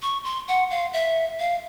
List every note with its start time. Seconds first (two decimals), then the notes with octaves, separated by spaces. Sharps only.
0.02 C#6
0.24 C6
0.48 F#5
0.71 F5
0.93 E5
1.39 F5